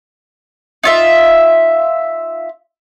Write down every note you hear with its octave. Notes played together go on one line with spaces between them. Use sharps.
D#4 F4 E5